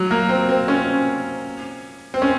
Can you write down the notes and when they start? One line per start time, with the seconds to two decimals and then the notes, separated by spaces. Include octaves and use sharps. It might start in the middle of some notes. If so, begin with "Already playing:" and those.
Already playing: F#3
0.11 A#3
0.29 C4
0.49 C4
0.68 C#4
2.14 C4
2.22 C#4